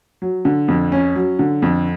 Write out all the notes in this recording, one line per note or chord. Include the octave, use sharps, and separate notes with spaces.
F#3
D3
F2
C#4
F#3
D3
F2